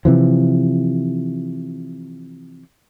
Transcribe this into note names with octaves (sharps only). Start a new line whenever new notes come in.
C3 E3 F3